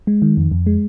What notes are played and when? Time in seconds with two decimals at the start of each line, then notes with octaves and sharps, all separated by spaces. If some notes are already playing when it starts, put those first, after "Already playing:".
0.07 G#3
0.22 D#3
0.37 F2
0.51 F2
0.66 G#3